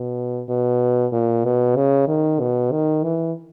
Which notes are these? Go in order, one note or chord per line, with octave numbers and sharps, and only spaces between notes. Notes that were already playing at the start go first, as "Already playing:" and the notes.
Already playing: B2
B2
A#2
B2
C#3
D#3
B2
D#3
E3